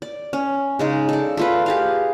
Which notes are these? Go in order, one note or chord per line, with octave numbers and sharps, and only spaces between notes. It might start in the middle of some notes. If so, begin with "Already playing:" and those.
D5
C#4
C#3 G#3 D#4
A4 D5
A3 F4 B4
G4 G#4 F5